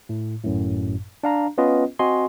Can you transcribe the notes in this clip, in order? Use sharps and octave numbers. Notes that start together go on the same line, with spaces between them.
A2
G#1 F#2 A2
D4 F5 A#5
B3 C#4 F4 B4 D#5
C4 F#4 D#5 G#5 C6